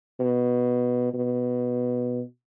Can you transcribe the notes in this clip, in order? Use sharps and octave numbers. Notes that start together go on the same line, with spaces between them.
B2
B2